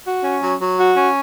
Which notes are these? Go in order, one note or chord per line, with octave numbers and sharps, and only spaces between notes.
F#4
C#4
F#3
F#3
F#4
C#4